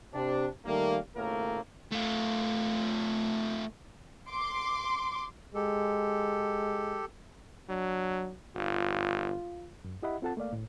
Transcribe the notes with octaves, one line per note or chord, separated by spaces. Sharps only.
C3 D4
D#3 G3 A3 A#3
G#1 A2 C#3 A3 A#3 A#4
A3 F4
C6 D6
G#3 G4 A4
F#3 D4
G1 F4
F#2
E4 G4 D#5 E5 F#5 B5
C4 F4 A4 F#5 A5
A3 A#3 D5 F5
A2